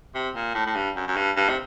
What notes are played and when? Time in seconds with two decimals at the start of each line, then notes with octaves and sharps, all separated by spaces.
0.15 C3
0.35 A#2
0.55 A2
0.66 A2
0.76 G2
0.96 F#2
1.07 F#2
1.16 G2
1.37 G2
1.48 C3